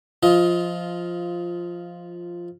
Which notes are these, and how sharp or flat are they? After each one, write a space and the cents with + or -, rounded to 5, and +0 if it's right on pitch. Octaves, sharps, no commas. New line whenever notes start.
F3 +0 F4 -5 D#5 +20